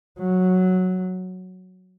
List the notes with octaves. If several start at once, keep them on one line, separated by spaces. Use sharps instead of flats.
F#3